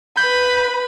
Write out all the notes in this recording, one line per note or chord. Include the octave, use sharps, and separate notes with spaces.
B4 B5 G6